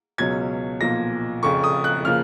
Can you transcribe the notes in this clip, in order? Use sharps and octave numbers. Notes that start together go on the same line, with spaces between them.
C#2 B2 F#3 C#4 G#6
B1 A#2 F3 A#6
F1 F2 C#3 C#6
D#6
F#6
C#3 F3 A#3 F6